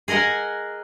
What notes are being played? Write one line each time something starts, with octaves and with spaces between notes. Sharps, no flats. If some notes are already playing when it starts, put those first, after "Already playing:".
G#4 A#4 D#5 F#5 G#5